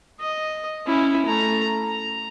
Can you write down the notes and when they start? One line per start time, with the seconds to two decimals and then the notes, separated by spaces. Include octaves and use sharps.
0.20 D#5
0.86 C#4 E4
1.26 A3 A#5
1.83 A#5